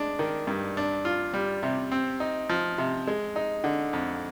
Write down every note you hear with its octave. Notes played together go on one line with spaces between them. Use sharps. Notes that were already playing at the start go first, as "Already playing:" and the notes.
Already playing: G#3 D4
D#3
G2
D4
F4
G3
C3
C4
D#4
F3
C3
G#3
D#4
D3
F2